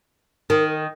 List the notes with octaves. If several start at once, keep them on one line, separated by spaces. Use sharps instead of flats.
D#3